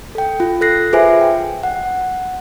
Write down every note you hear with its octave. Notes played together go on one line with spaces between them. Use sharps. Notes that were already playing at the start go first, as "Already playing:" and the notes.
A4 G5
F4
A4 F#6 A#6 C7
F4 G#4 B4 C5 E5 G#5
G5
F#5